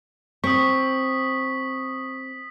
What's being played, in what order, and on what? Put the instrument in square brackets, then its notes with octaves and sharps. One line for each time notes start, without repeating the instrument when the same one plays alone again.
[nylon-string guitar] C4 [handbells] C#6 [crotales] D#6 B6